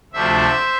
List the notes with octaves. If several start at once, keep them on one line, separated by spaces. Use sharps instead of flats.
D2 C3 F3 A3 D4 C5 E5